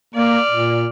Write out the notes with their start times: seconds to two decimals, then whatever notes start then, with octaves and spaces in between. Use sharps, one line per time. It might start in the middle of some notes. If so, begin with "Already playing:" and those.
0.14 A#3 D5 F6
0.50 A#2